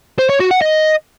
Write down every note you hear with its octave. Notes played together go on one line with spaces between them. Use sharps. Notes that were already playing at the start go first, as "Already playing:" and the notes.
C5
C#5
F#4
F#5
D#5